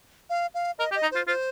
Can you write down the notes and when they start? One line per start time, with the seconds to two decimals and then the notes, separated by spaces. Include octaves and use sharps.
0.30 F5
0.54 F5
0.78 A#4 D#5
0.91 G4
0.95 D#5
1.02 D#4
1.11 F4 C5
1.27 F4 C5